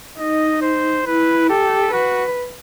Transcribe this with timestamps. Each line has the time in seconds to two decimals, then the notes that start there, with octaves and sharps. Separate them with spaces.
0.18 D#4 D#5
0.62 C5
1.07 E4 B4
1.50 G4 A4
1.93 F#4 B4